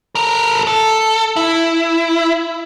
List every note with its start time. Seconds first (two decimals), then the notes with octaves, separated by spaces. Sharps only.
0.15 A4 A#4
0.67 A4
1.36 E4